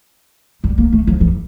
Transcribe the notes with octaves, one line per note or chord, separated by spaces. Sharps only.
G3
A#3
A3
F3
E3